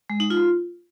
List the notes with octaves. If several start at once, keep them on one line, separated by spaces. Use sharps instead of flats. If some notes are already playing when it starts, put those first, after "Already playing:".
G#3
D#4
F4